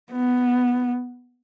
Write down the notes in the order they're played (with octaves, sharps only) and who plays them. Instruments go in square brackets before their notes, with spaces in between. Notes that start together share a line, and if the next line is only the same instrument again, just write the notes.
[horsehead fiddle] B3